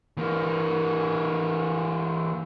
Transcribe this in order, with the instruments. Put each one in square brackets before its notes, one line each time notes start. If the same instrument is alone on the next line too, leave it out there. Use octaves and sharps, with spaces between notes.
[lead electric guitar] E3 A#3